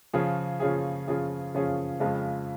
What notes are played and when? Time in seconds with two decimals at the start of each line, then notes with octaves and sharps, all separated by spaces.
0.13 C#3 F3 C#4 F4 G#4
0.60 C#3 F3 C#4 F4 G#4
1.08 C#3 F3 C#4 F4 G#4
1.54 C#3 F3 C#4 F4 G#4
2.00 F2 C#3 F3 G#3 F4